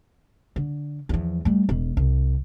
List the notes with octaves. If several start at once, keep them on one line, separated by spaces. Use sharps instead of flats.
D3
E2 F3
G3 A3
E1
C2